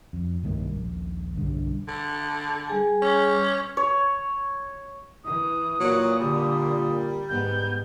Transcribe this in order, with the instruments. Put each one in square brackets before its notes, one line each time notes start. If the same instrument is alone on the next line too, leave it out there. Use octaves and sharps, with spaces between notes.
[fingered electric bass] F2
B1 G2 D#3 A#3
D#1 A#1
B1 G2 D3
[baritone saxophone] D3
[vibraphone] G3 G#4 G#5
[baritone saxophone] C#4
[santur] C#5
[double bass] E3 [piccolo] D#6
[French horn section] A#2 [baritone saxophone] F#3
[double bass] D3 [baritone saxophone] G3
[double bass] G#2 B3 [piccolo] G6